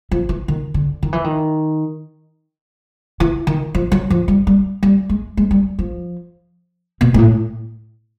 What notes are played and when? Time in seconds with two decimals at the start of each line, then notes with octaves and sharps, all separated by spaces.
0.11 F3
0.29 E3
0.48 D#3
0.74 D3
1.03 D#3
1.13 E3
1.24 D#3
3.20 E3
3.47 D#3
3.75 F3
3.92 F#3
4.10 F3
4.28 G3
4.47 G3
4.83 G3
5.09 G#3
5.37 G#3
5.51 G3
5.79 F3
7.01 B2
7.14 G#2
7.18 A2